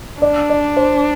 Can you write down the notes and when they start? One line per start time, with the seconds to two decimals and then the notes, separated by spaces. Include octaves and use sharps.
0.22 D4 D5
0.50 D5
0.77 C5